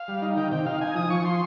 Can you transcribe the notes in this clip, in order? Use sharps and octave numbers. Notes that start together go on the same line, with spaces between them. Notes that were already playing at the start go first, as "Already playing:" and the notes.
Already playing: F5
G3
D#4
D#3 G5
C3 G5
D#4 F5
D#4 G#5
F3 D#6
F3 C#6
C6